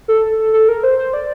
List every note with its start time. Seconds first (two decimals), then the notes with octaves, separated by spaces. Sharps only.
0.08 A4
0.53 A4
0.68 A#4
0.83 C5
0.99 C5
1.13 D5